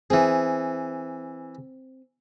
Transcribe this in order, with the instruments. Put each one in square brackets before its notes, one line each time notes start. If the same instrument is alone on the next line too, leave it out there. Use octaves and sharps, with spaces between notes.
[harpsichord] E3 G#4 [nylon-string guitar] C4